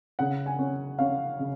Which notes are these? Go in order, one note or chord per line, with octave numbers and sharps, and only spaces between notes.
C#3 F#5
G#5
C#4
C#4 F5
C#3